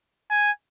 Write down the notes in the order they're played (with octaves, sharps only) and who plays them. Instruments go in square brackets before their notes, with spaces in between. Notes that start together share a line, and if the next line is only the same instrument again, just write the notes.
[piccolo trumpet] G#5